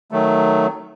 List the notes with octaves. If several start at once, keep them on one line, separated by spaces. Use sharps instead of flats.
D#3 F#3 A3